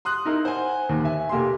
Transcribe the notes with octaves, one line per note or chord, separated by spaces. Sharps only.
C6 D#6 F#6
D#4 E4 A#4 C6
C5 F#5 G#5
D#2
E5 G#5
F1 A#3 G4 C6